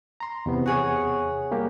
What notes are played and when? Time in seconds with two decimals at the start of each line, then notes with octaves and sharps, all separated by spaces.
0.20 A#5 C6
0.46 E2 C3 B3
0.66 F#4 G#4 C#5
1.51 G3 A#3 G4